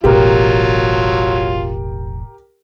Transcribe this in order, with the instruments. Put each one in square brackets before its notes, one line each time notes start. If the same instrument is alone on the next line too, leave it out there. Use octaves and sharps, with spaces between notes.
[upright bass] E1 A1 [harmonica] F#3 F4 [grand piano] G4 A#4